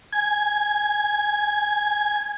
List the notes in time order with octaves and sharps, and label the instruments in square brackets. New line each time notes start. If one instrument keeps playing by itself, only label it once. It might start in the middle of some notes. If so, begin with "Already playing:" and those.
[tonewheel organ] G#5 G#6